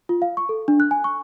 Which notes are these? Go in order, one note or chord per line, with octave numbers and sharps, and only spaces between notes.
F4
F5
C#6
A4
D4
F#6
G#5
C#6